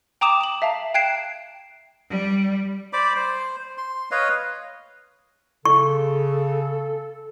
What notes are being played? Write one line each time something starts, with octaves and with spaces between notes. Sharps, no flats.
G5 A#5 D6 D#6 E7
E7 F#7
E5 F5 A5 A#5
G5 F#6 G#6 C7 D7 E7
G3
C5 D5 B5 D6
C5
C6
B4 C#5 D#5 F5
C#3 A4 C#6